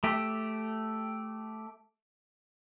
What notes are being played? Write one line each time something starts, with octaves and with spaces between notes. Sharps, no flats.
A3 G4